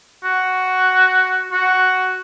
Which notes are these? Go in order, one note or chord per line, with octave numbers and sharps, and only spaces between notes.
F#4
F#4